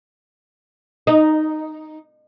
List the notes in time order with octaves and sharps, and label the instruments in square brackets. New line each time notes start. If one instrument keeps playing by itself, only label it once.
[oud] D#4